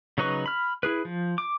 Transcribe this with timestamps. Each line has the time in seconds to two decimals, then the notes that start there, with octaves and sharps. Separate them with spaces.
0.18 C#3 F#3 D#4 B4 C#6
0.46 B5 F6
0.83 E4 G#4 B4
1.05 F3
1.38 D6